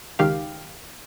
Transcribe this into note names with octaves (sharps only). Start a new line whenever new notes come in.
C#2 D#3 G4 F5